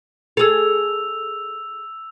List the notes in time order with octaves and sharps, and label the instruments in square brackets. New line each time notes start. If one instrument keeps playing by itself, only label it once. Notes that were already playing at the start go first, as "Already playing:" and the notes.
[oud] G#4 A4 [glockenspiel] E6 F7